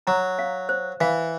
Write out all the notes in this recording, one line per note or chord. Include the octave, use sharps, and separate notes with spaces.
F#3 A#5
F5
C5
E3 F5